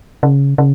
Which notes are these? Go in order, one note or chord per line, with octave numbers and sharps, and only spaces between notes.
C#3
C#3